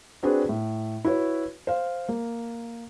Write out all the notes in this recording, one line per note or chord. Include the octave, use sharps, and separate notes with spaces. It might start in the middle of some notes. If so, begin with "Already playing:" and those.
C4 D4 F#4 G#4 B4 C5
A2
E4 F#4 B4 C#5
C5 F5
A#3